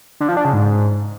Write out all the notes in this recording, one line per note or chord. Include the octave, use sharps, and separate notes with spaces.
D3
F3
D4
C#3
G#2